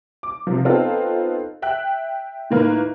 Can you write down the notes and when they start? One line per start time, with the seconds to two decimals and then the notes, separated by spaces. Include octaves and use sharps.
0.23 D6
0.47 C3 F3
0.65 B3 C4 D#4 F4 A4
1.62 E5 G5 F#6
2.50 A2 D#3 A#3 B4 F6